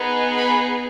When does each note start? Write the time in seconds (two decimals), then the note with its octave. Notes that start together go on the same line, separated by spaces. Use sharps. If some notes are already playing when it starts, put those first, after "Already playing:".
Already playing: B3 D#4 G#4
0.37 B5